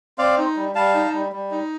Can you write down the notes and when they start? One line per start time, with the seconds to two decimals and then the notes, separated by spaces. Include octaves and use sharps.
0.18 C4 D5 F5
0.37 D#4
0.57 G3
0.75 G3 F5 A5
0.94 D#4
1.13 G3
1.32 G3
1.51 D#4